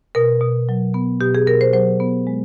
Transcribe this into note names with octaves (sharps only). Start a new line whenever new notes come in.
B2 A#4
B2
F#3
B3
B2 G4
G#4
B2 A#4
C5
F#3 C5
B3
G#3